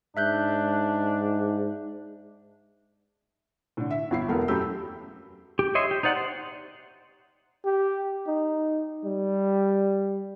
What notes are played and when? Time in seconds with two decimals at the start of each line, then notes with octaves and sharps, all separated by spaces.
0.17 G#2 D4 E5 F#6 G6
3.77 A2 D3
3.90 E5
4.11 G1 E4 C7
4.28 E1 A3 B3 A#4
4.48 F#2 A3 G4 B5 E6 G6
5.59 G4
5.75 C#5 D#5 E5 C6
5.91 G4
6.03 D#4 C5 D5 F#5
6.17 C5
7.65 G4
8.27 D#4
9.05 G3